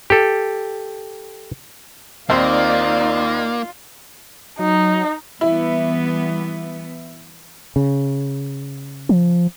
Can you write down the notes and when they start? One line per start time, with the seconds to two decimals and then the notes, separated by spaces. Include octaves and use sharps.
0.10 G4 A4
2.30 D#2 A#3 C4 D#4 F4 D5 C6
4.59 F#3 D#4
5.41 E3 G3 B3 E4
7.76 C#3
9.09 F3